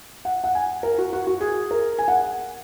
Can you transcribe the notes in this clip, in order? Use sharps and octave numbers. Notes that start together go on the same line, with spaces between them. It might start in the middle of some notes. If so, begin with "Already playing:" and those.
F#5
F#5
G#5
A#4
F#4
F#4
F#4
G#4
A#4
G#5
F#5